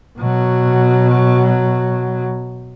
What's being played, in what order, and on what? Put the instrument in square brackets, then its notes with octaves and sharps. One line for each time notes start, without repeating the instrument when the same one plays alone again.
[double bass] B2 F#3